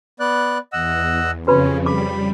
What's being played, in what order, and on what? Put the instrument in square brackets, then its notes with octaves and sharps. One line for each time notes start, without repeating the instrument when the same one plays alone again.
[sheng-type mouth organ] B3 D5 F#6
[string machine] E2 [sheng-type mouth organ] D#5 F#5 E6
[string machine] F2 C#3 [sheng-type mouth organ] C#4 [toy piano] F#4 B4 B5
[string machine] G3 [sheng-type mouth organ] B5 [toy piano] D6